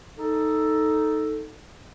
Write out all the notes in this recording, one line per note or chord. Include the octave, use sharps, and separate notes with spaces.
D#4 A4